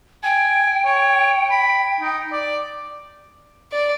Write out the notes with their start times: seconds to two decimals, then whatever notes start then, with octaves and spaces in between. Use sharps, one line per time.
0.24 G5 G#5
0.85 C#5
1.51 B5
2.01 D#4
2.32 D5
3.72 D5